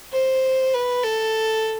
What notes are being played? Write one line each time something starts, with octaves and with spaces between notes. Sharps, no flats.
C5
B4
A4